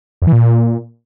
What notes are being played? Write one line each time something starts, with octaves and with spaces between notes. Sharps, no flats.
F2
E3
A#2